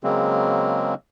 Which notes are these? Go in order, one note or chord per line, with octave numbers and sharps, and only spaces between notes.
C#3 F#3 G#3 A#3 C4